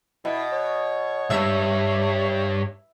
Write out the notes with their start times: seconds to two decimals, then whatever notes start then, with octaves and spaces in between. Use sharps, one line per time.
0.25 B2 E4
0.52 C#5
1.30 C2 G2 E5